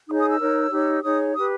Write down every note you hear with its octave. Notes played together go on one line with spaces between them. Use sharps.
D#4 G#4 C#5 D#6
D#6
E6
D#4 A#4 C#5
D#4 G4 C#5
D#4 G#4 C#5 D#6
G4 B4 D#6